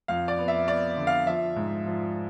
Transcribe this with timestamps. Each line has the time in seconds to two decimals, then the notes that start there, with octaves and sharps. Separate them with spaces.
0.08 F2 F5
0.28 D5
0.38 B3
0.48 E5
0.67 B3 D5
0.97 D3
1.07 F5
1.26 F3 E5
1.56 G#2
1.86 F3